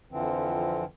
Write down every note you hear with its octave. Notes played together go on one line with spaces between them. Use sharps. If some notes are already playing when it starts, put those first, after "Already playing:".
F2 D3 E3 F3 C4